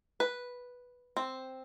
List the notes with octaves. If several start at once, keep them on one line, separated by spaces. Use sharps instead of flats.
B4
C4